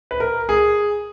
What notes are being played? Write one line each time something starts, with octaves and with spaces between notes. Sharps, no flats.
B4
A#4
G#4